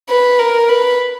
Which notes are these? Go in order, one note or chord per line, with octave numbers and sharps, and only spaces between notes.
B4
A#4
B4